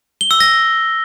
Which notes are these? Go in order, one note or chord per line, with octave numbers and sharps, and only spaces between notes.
G7
E6
A#6